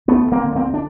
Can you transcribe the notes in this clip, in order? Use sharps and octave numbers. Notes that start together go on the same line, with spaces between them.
D2 A3 B3
D2
A#3 C4
D3
B3
A#3 C4
D2
D4